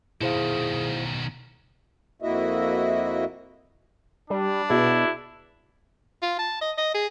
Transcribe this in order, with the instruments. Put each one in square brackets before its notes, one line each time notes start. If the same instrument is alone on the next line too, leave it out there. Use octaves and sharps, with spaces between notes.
[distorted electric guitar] B2 D#3 [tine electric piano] E4 C5 F5 [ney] G#4
[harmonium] F2 A#3 E4 F#4 D#5 E5
[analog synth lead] G3 [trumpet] D4
[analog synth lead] B2 [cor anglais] E4 [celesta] F#4 G#4
[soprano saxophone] F4
A5
D#5
D#5
G#4